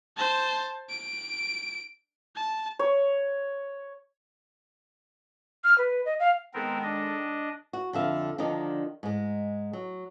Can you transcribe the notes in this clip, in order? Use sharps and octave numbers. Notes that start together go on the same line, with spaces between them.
C5 A5
D7
A5
C#5
F6
B4
D#5
F5
D#3 G#3 B3 C4 A4 A#4
D4 D#5
F#4
F2 D3 E5 F5
D3 D#3 F3 D4 D#4
G#2 G#3
F#3